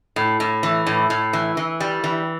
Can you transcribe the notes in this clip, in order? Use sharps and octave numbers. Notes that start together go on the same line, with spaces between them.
A2
A2
E3
A2
A2
E3
E3
G3
E3